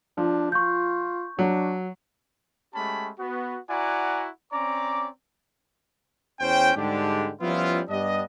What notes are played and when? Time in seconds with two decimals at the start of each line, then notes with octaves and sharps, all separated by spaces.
0.18 F3 D4
0.52 F4 C#6 G6
1.39 F#3 D4
2.75 G#3 A3 C#4 G4 A5 B5
3.19 B3 F#4
3.70 E4 F#4 D5 F#5 G#5 A#5
4.53 C4 C#4 D5 A#5 D6
6.40 E2 C#4 C5 C#5 G5
6.76 G#2 D3 G3 G#3 D4 G4
7.41 F3 G3 B3 C#4 E4 F4
7.89 G2 B3 D4 G4 D#5